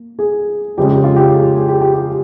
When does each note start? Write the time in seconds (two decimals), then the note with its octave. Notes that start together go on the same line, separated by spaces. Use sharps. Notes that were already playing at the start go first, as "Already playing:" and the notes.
Already playing: A#3
0.19 G#4
0.77 F2 C#3 G#3 C#4 G4
0.90 G4
1.04 F4
1.16 G4
1.36 G#4
1.56 G#4
1.68 G4
1.81 G4
1.94 G4